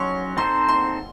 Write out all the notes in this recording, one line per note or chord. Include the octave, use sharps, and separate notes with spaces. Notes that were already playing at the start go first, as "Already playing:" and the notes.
Already playing: F#3 C#4 F#4 C#5 C6 C#6
C4 D#4 A4 C5 C6
C6